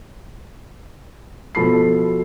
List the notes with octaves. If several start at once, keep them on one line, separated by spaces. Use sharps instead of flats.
B2 F3 A4 B5 C7